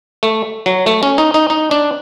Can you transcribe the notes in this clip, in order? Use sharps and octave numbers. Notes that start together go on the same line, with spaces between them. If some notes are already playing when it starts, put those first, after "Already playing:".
A3
F#3
A3
C#4
D#4
D#4
D#4
D4